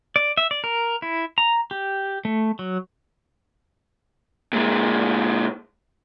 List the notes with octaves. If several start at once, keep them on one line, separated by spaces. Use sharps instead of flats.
D5
E5
D5
A#4
E4
A#5
G4
A3
F#3
A#2 G#3